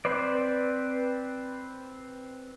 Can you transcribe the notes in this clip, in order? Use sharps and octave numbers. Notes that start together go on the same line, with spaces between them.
C4 B4 C5 D5